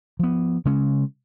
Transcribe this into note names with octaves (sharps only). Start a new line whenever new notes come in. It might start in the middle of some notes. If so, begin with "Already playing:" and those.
F3 B3
C#3 G#3 C#4